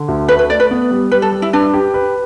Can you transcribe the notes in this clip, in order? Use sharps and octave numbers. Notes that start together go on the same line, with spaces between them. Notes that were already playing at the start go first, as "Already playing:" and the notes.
Already playing: D3
D2
A3 B4
B4
A3 D5
B4
B3
G3
G3 B4
A4
G3
E4
D4 B4
G4
B4